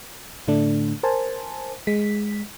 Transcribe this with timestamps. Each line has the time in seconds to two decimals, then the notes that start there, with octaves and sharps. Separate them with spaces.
0.48 A2 D3 A3 D4
1.03 A#4 C5 G#5 A5
1.87 G#3 B6